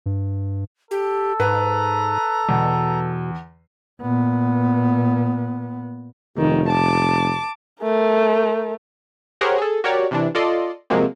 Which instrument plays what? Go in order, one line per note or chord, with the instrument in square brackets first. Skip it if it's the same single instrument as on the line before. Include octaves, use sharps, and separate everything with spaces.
[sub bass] G2
[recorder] G4 [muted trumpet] A4
[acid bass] G#2 [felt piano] B4 [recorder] A#5
[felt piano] E2 [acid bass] B2
[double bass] A#2 B3
[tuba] F1 [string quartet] D#3
[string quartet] A5 D6
[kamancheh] A3 A#4
[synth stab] G4 G#4 A#4 C5 C#5 F#5
G#4 A4
F#4 G4 A#4 C#5 D5
C3 E3 D4
F4 A4 D5 D#5 C6
C3 F3 F#3 G#3 A#3 C4